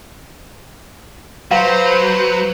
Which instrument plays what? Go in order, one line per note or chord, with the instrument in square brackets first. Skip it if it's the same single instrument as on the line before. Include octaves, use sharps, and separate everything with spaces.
[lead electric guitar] F#3 [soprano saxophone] B4 [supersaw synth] C5 [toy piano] F5